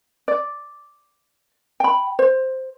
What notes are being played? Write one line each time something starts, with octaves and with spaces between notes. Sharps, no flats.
D5
G5 B5
C5